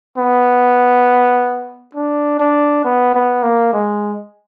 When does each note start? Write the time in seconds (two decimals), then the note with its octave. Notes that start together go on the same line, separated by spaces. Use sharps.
0.18 B3
1.95 D4
2.40 D4
2.85 B3
3.14 B3
3.43 A#3
3.73 G#3